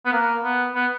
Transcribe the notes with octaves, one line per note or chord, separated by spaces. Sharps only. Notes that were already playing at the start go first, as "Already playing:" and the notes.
B3
A#3
B3
B3